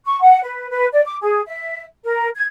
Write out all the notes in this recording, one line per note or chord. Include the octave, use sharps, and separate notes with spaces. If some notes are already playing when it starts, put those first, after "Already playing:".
C#6
F#5
B4
B4
D5
D6
G#4
E5
A#4
G#6